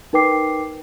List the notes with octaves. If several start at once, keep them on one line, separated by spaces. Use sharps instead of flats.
D#4 A#4 B4 G5 D6 C7